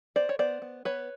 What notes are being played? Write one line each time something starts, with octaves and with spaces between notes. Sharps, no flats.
B3 C5 D5
C#5
B3 C5 D5
B3
B3 B4 C#5